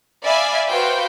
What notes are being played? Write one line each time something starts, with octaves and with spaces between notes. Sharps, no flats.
D5 E5 F5 G#5 B5
F#4 B4 C5 F5 G5